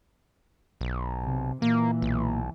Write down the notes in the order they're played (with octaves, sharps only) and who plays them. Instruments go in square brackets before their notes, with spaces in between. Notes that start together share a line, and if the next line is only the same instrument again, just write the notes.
[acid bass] B1
[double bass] C3
[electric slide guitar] A#2 [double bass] E3 [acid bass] A#3
[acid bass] B1